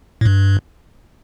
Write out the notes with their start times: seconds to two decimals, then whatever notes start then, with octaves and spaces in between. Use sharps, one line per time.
0.21 A2
0.25 G2